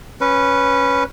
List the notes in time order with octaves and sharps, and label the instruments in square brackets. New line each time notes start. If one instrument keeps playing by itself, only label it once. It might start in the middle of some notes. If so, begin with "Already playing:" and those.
[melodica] C#4 B4